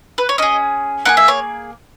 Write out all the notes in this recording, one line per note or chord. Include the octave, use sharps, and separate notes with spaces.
B4
C#5
C#4 G#4 D#5
A#3 D#4 G#4 F#5
E5
C#5